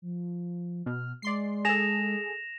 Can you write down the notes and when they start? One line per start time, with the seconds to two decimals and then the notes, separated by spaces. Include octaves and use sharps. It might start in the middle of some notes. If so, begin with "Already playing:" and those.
0.02 F3
0.86 B2 F6
1.22 G#3 D5 C6 C7
1.65 G#4 A4 A#6 E7 F7